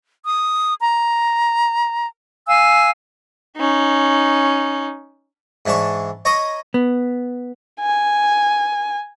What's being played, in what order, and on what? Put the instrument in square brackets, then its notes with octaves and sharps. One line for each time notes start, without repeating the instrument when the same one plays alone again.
[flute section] D#6
A#5
F5 G#5 E6
[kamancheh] C#4 D#4
[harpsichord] G#2 E3 D4 A5 C#6
C#5 D#5 A#5 B5 D#6
[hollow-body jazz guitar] B3
[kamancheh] G#5